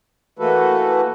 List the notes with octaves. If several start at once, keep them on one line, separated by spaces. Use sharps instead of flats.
E3 A3 A#3 F#4 A4 B4